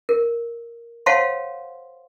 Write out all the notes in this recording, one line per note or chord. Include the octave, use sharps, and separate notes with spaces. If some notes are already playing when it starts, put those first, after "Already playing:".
A#4
C5 C#5 F5 F#5 A5 C6